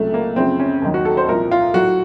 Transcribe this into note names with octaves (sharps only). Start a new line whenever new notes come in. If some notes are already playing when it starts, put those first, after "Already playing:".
Already playing: C#2 C3 F#3 A3
A#3
F#2 C#3 F3 C4
C#4
D#2 D#3 F#3
F#4
A4
C5
C2 A#2 F3 A#4
F4
A2 F#3 F#4